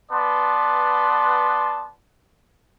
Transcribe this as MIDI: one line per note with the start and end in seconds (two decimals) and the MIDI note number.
0.11 1.90 59
0.11 1.90 71
0.11 1.90 74
0.11 1.90 81
0.11 1.90 84